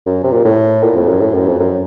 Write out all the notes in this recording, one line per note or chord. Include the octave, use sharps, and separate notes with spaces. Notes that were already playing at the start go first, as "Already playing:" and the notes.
F#2
C3
A#2
A2
A#2
F2
F#2
A2
F#2
F2
F#2